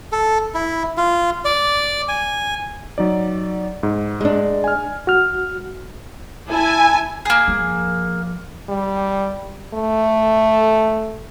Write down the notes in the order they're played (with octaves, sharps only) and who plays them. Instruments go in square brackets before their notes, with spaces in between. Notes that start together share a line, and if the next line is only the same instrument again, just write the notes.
[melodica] A4
E4
F4
D5
G#5
[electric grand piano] F#3 D#4 D5
G#2
[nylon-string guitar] G#3 D4
[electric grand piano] G#5 F6
[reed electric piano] F#4 F6
[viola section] E4 A5 [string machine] G#5
[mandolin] A#3 G#4
[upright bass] F3
[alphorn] G3
A3